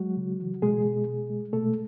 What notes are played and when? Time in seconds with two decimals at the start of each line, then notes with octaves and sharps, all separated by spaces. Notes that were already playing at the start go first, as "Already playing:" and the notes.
Already playing: F#3 G#3 F#4
0.17 C#3
0.40 E3
0.62 B2 G#3 G#4
0.85 B2
1.07 G#3
1.30 G#3
1.53 B2 A3 A4